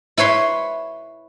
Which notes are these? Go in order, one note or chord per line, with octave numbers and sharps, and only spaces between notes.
E4 B4 C#5 C6